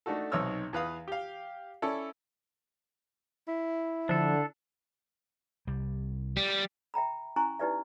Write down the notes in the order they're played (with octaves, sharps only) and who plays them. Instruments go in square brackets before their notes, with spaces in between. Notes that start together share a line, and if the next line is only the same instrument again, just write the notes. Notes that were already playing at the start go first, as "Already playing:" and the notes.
[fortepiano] A3 D4 D#4 F#4 A4
B1 C3 D#4 C#5 E6 F6
E2 B4 F5 D#6
G4 F5
C#4 E4 A4 D5
[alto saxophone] E4
[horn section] D3 [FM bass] F3 [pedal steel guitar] D4 A4
[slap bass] C2 G3
[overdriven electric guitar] G3
[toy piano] E5 G5 A#5 B5
C#4 E4 G#5 A#5 C#6
D#4 E4 G4 B4 D5 E5